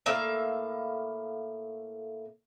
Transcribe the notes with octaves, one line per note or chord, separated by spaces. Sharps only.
A2 A#3 E5 F5